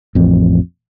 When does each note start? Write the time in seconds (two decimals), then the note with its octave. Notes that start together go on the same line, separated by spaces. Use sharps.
0.15 A1 F2